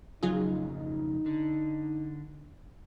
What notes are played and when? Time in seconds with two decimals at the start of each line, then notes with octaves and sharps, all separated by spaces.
0.23 F2 C#3 F#3 D#4 F4 G#4
1.26 D3